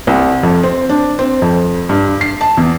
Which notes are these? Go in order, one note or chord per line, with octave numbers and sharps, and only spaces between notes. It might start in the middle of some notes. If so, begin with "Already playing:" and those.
C2
F2
C4
D4
C4
F2
G2
C7
A5
E2